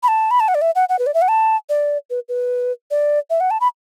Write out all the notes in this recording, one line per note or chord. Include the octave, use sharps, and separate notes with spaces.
B5
A5
B5
A5
F#5
D5
E5
F#5
F#5
B4
D5
E5
F#5
A5
D5
B4
B4
D5
E5
F#5
A5
B5